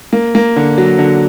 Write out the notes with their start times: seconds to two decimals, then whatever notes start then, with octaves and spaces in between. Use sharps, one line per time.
0.13 A#3
0.35 A#3
0.56 D3
0.78 F#3
0.99 D3